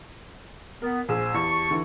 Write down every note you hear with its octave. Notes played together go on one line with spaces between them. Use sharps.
B3 A#4
A#1 G#4 C5 G#5 E6
E2 G4 A5 C#6
D3 E3